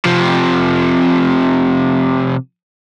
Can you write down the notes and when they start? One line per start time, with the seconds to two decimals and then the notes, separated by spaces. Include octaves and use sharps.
0.05 C3 F3